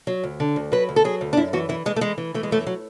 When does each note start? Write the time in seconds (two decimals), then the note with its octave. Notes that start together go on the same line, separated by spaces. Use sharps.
0.07 F#3
0.23 D2
0.40 D3
0.56 D2
0.72 F#3 B4
0.89 D2
0.96 A4
1.04 F#3 G#4
1.21 D2
1.33 D4
1.37 F#2 E4
1.53 E3 F#4
1.69 E3 E4
1.86 E3 G#3
1.96 A3
2.01 E3 G#3
2.18 E3
2.34 E3 A3
2.43 G#3
2.51 F#2 A3
2.67 F#3